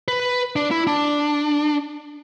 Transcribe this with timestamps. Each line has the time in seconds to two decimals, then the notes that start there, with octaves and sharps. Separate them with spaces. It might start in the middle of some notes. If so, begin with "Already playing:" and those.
0.08 B4
0.56 D4
0.71 E4
0.87 D4